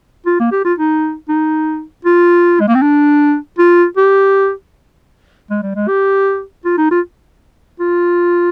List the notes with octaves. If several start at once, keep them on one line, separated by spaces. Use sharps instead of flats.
F4
A#3
G4
F4
D#4
D#4
F4
G#3
A#3
C4
D4
F4
G4
G#3
G3
G#3
G4
F4
D#4
F4
F4